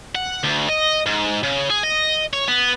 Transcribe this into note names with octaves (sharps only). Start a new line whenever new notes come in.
F#5
D2
D#5
G#2
C#3
G#4
D#5
C#5
B3